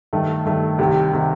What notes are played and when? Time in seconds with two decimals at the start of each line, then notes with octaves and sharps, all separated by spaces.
0.13 G2 D#3 A3
0.46 G2 D#3 A3
0.79 C2 C3 D#3 G3
1.12 C3 D#3 G3